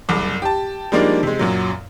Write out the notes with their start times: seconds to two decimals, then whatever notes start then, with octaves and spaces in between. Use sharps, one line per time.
0.09 F#1 C2 D6
0.42 G4 A5
0.92 F3 G3 G#3 A#3 D4 D#4
1.23 C3 G#3
1.39 F#2 A#2 F#3